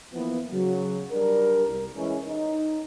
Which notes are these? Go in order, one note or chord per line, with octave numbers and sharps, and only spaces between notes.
E3 F3 A#3 B3
C#3 F#3
G3 D4 A#4
C2
E3 G#3 C#4
D#4